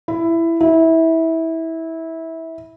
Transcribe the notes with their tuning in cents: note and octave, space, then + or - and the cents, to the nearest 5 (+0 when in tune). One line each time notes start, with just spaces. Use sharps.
E4 +10
E4 -20